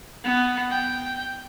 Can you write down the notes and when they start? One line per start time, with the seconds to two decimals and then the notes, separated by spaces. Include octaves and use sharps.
0.24 B3
0.70 G5